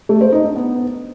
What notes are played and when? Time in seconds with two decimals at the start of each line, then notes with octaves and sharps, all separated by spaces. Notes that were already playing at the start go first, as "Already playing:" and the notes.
0.09 A3
0.21 C5
0.32 D#4
0.44 D4
0.56 B3